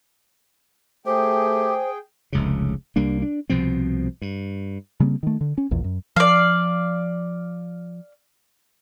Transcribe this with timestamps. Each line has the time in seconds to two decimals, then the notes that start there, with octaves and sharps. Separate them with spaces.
1.06 A3 G4 G#4 C5 G5
2.33 F1 C#2 C#3
2.96 C2 G3 A#3 D4
3.22 D4
3.50 C2 B2 F3 C4
4.22 G2
5.00 C#3 G3 A#3 C4
5.23 D#3 A3
5.41 D3
5.58 C#4
5.71 A#1 E2
5.84 F#2
6.16 F3 D5 F5